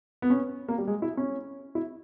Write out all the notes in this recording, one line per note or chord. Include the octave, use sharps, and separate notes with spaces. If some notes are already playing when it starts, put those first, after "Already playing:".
B3
C#4
A#3
G3
G#3
E4
C#4
E4